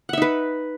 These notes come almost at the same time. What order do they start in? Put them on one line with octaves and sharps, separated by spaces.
F#5 E5 D#4 B4